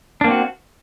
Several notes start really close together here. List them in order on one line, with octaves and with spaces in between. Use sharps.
D4 A#3 C4 F#4